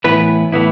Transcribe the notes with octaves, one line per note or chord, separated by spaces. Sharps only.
A2 E3 B3 E4 B4
A2 E3 B3 E4